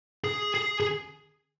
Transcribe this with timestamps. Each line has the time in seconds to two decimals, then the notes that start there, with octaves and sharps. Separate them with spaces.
0.24 G#4
0.54 G#4
0.80 G#4